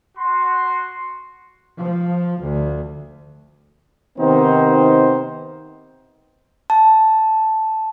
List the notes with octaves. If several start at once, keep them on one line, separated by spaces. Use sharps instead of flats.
F#4 C6
F3
D2
C3 D#3 B3 C4 D#4 C5
A5